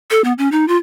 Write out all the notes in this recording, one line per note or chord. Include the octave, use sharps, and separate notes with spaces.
A4
B3
C#4
D#4
F4